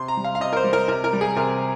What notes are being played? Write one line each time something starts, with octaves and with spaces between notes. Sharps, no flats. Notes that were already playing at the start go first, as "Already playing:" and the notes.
Already playing: C3 C6
A#5
G3
F5
F5
C3 D#5
A#4
C5
G3
A#4
C3 A#4
A#4
G3
G#4
C3 A#4